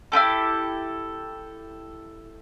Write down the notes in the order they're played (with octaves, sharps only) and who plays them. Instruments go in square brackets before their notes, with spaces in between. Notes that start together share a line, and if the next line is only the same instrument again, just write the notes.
[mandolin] E4 F4 G4 A4